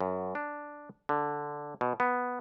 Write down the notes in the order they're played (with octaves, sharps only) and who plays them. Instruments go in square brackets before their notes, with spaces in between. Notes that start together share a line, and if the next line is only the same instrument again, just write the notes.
[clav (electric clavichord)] F#2
D4
D3
B2
B3